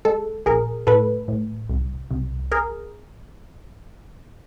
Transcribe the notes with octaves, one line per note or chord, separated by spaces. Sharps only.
G#3 A4
A#1 G#4 A#4
A2 A4 B4
A2
C2
C2
G#4 A#4